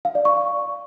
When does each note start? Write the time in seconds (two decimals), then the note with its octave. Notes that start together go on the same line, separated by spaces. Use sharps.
0.05 F5
0.15 D5
0.25 C#6